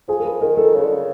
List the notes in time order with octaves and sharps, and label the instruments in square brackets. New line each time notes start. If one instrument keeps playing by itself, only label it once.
[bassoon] F3 [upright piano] G#4
[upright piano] A#4
B4
[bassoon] D#3 [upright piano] A#4
[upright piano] A4
[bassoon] C#3
D3
C#3